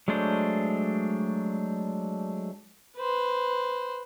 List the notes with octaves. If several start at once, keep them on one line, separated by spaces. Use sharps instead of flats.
F#3 G#3 A3 D4 C5
B4 C5